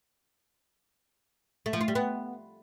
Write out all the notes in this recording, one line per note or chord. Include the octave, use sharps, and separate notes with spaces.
A3
F3
F4
G3
B3